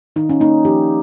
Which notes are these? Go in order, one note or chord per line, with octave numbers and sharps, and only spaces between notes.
D#3 D#4
C#4
A#3 D#4
F3 G4